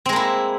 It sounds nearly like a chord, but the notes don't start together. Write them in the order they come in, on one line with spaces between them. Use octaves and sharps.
C4 G#3 A#3 E4